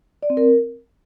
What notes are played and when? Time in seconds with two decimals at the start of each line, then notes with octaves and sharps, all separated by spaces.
0.23 D5
0.30 C4
0.37 A#4